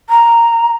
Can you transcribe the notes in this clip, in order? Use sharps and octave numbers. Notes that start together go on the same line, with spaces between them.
A#5